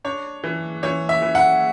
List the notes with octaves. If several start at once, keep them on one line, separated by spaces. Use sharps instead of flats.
D4 C#5
E3
E3 C#5
E5
E3
F#5